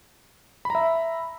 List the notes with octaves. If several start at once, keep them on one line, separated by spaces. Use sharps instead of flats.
E5 A#5 B5